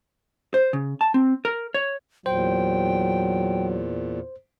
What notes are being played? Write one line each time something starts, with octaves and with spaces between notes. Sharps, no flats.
C5
C#3
A5
C4
A#4
C#5
E2 A#2 F#3 C5 G5